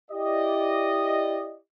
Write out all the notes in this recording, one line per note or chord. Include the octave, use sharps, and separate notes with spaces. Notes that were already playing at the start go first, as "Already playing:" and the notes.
E4 G4 D5 D#5